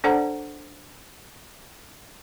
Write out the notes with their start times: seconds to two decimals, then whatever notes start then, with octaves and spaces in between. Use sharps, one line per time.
0.04 D4 A4 C5 D5 F#5 A#5